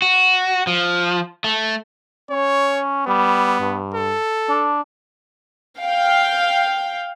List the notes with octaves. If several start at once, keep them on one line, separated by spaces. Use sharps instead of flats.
F#4
F3
A3
C#4 C#5
G3 B3
G2
A4
D4
F5 G5